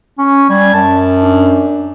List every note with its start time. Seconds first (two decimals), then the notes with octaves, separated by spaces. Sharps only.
0.18 C#4
0.49 G3 G#6
0.74 F#2 A5
1.23 D4